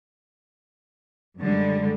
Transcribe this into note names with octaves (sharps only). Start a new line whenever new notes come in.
F#2 D3 G3 G#3